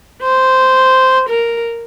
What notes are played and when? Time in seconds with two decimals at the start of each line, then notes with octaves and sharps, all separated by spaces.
0.22 C5
1.29 A#4